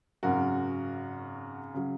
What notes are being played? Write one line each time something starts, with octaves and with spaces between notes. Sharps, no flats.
G#1 F#2 C#3 F#3 F#4 A#4
C#3 F#3